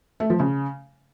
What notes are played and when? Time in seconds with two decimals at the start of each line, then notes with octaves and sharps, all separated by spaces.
0.20 A3
0.30 F3
0.40 C#3